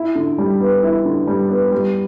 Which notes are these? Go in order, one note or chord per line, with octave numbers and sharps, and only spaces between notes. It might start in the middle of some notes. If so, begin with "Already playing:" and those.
Already playing: E4
D3
G3
B3
E4
D3
G3
B3
G3